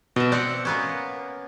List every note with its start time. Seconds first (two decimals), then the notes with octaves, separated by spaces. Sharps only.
0.16 B2 D#5 E5
0.32 C4 D5 F#5
0.65 A#3 B3 C#4